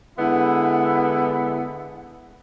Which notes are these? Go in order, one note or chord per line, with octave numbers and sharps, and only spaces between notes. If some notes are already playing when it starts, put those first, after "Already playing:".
D3 G#3 B3 E4